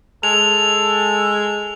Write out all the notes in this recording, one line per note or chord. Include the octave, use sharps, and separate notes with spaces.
G#3 A4 F7